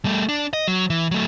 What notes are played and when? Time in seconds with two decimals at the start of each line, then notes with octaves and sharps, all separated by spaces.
0.05 G3 A3
0.29 D4
0.53 D#5
0.68 F#3
0.90 E3
1.11 F#3 A3